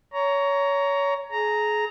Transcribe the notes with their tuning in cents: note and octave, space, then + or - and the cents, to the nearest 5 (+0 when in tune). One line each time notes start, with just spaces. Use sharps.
C#5 +20 A#5 +0
G#4 +30 A#5 -5